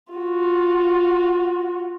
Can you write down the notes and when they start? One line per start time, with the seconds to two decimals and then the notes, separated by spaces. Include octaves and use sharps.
0.13 F4 F#4